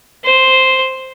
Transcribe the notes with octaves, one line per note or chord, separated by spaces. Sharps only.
C5